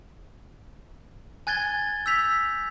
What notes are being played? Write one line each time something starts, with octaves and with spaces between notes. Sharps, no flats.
G#5 F#6 G#6 A6 G7
E6 G6 B6 F7